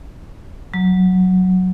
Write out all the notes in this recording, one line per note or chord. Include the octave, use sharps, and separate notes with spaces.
F#3